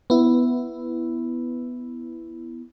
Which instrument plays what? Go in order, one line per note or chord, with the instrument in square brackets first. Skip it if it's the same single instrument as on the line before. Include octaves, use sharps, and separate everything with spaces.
[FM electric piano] B3 E4